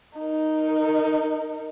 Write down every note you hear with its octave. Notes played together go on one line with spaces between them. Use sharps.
D#4 A#4